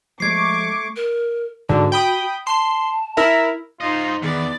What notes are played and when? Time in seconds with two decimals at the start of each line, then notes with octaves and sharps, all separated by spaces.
0.20 F3 G#3 A3 C#6 D6 G#6 C7
0.96 A#4
1.69 G#2 D3 F#4
1.92 G5 B5 D#6
2.47 A5 C6
3.17 E4 A#4 E5
3.81 D#4 F4 C5 D#5
4.22 E2 D#3 B3 G#4 D5